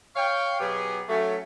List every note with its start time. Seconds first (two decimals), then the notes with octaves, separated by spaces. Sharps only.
0.16 C#5 F5 G5
0.60 B2 F#3 B3 G4 G#4
1.09 F#3 A3 C#4